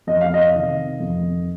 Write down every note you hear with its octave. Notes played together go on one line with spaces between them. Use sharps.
F2 D#5
F5
D#5
C3 D#3
F2